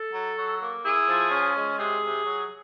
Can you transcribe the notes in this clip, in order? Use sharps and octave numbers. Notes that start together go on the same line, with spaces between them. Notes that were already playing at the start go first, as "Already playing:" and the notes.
Already playing: A4
F#3
F#3
A#3
E4 G#4
F3
C#4
G#3
C3 G#4
C3
F#3